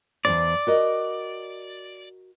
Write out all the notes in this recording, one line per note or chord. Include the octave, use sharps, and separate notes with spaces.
E2 G2 C5 D5
F#4 A#4 D#5